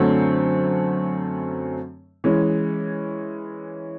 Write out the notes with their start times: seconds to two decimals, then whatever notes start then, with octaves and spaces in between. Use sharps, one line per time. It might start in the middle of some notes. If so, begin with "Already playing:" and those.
Already playing: F#2 D3 F#3 A3 C4
2.24 E3 G#3 C#4